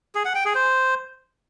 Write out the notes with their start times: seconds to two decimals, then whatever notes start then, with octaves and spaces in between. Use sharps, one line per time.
0.15 G#4
0.25 F#5
0.35 G5
0.45 G#4
0.55 C5